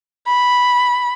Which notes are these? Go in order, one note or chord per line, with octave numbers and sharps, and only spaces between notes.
B5